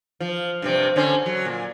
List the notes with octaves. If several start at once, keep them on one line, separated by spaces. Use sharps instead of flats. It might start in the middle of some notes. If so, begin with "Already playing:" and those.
F3
G2 C3 C4
D3 C#4 C5
F#3
A#2